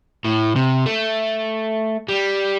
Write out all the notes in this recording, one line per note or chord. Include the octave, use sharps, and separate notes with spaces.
A2
C3
A3
G3